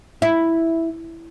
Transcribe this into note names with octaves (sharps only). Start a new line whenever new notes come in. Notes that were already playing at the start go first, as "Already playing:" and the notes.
E4